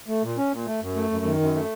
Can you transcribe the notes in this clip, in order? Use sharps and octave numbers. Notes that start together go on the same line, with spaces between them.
A3
A#2
C#4
A#2
A3
F#2
A3
F#2
D#3
F#2
A3